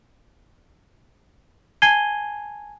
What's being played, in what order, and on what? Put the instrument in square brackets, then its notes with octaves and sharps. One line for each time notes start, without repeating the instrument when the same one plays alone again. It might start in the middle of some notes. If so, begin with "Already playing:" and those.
[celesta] G#5 A5 G#6 C7 D#7 G7